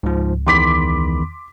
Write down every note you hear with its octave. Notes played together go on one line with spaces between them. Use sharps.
C#2 G#2 F3
E2 D#3 B5 C6 D6 B6